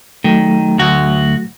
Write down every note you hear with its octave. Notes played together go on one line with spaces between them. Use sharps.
D#3 F#3 A3
D2 F#4